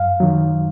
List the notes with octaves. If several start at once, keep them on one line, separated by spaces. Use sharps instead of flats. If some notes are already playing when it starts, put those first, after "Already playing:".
Already playing: F#2 F5
D#3 F#3